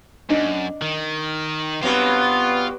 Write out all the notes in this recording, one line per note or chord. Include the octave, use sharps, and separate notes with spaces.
F#2 D4 D#4
D#3
G2 F#3 B3 C4 F4